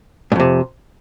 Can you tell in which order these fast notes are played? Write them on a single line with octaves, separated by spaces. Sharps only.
G#2 F2 C3